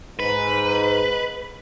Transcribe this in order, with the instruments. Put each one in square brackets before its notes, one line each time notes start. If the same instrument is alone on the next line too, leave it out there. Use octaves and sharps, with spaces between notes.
[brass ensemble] G#2 [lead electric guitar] B4